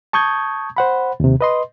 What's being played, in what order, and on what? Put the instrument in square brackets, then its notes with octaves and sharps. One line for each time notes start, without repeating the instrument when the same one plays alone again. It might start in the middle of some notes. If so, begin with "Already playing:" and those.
[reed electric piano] A5 C#6 D#6 G6 G#6
C5 F#5 B5
D#2 C3
B4 D#5 C6